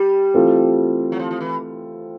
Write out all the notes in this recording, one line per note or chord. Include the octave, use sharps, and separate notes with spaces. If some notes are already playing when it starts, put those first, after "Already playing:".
Already playing: G3
E3 A3 C4 F4 A4
F#3
F3
F3
E3